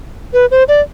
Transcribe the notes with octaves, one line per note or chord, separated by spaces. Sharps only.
B4
C5
D5